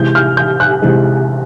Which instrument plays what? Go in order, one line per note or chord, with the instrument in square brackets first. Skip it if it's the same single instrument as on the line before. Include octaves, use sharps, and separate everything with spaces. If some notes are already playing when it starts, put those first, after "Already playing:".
Already playing: [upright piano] C3 E3 G#3 G6
F6
G6
F#6
C3 E3 G#3